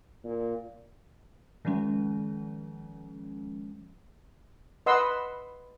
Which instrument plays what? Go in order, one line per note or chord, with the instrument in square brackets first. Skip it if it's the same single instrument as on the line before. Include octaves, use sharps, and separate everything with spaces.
[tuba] A#2
[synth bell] D#3 F3 G#3 C#4
[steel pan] B4 D#5 F#5 C6 E6